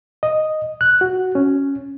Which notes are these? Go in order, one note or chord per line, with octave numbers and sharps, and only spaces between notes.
D#5
F#6
F#4
C#4